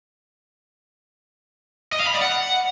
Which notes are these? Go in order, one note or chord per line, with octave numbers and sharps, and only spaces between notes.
D#5
F5
B5
D5
F#5